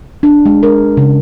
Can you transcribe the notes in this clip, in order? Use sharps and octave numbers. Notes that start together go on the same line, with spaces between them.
D4
G#3
A#4
C#3